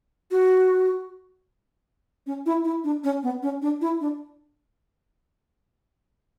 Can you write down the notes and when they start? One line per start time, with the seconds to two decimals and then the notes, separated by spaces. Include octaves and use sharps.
0.31 F#4
2.27 C#4
2.46 E4
2.64 E4
2.84 D4
3.04 C#4
3.23 B3
3.43 C#4
3.62 D4
3.81 E4
4.01 D4